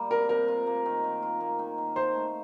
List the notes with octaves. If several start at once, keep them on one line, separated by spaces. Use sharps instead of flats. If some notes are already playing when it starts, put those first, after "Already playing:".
Already playing: G3 A#3
C3 A#4
C3 A#4
F4
A#3
D#3
D#3
F4
A#3
D#3
D#3
D#4 C5
A3